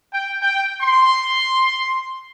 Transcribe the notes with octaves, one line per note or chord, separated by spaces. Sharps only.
G5
G5
C6